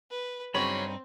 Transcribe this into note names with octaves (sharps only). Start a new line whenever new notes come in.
B4
G2 C#3 F#3 C4 D#4 C#5 B5